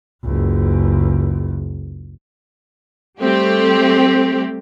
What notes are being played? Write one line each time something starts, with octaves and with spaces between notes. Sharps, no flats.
F#1 C#2
G3 A3 C4 G4